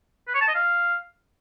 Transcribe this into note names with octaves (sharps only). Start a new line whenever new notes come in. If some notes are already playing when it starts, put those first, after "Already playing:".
B4
C#5
A5
D#5
F5